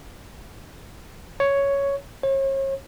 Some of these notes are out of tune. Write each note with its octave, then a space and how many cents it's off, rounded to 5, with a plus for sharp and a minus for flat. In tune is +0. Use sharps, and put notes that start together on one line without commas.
C#5 +5
C#5 -40